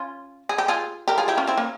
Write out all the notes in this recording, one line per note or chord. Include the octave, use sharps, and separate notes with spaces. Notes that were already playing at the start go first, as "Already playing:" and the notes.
Already playing: C#4 F4
G#4
G4
F4 G#4
G4 A#4
F4 G#4
E4 G4
C#4 F4
C4 E4
A#3 C#4